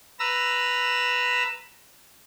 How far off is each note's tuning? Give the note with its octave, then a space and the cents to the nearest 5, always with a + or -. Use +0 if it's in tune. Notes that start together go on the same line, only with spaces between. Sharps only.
B4 +0 A#5 -5 E6 +15